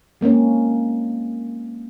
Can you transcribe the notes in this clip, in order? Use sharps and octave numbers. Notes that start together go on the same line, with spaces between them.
G#3 A#3 C4 C#4